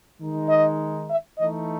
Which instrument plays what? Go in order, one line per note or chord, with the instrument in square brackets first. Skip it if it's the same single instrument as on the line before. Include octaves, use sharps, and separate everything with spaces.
[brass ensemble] D#3 G#3 D#4
D#5
E5
E3 A3 D#4 D#5